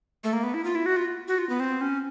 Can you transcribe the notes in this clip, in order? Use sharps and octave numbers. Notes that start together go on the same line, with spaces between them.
A3
A#3
B3
E4
F4
E4
F#4
F4
F#4
F4
B3
C4
C#4